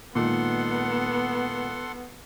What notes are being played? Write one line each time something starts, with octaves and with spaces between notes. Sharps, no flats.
A#2 D#3 G#3 B3 A4 F#5 C6